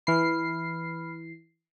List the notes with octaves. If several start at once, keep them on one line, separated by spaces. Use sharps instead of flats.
E3 B5 F6 C7